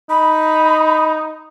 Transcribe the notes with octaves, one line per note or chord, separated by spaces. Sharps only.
D#4 B5